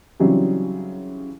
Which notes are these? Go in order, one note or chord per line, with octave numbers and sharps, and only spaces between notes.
C#3 E3 F#3 G3 C4 D#4